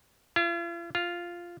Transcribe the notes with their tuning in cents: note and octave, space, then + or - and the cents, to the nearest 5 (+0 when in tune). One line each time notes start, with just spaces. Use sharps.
F4 -45
F4 -5